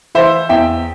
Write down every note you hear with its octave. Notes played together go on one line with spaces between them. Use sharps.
E3 C5 E5
E2 E5 G5